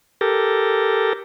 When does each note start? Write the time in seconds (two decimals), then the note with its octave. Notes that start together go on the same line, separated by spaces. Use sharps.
0.21 G4 A4 A#4